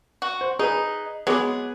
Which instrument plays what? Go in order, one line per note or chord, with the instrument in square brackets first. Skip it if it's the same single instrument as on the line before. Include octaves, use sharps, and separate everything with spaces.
[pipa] F#4
[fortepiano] C5
[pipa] D#4 [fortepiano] G#4 B4
[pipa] F#3 G#3 [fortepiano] B3 G#4 D6